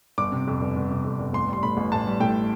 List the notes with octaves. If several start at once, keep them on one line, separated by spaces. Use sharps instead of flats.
G1 D6
C3
F2
G1
G1
C3
F2
G1
A1 C6
G3 C6
A2 B5
A1
A1 A5
G3
A2 G5